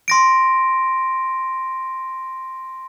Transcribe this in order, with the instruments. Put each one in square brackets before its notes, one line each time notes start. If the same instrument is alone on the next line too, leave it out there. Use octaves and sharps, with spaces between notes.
[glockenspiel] C6 A#6 D7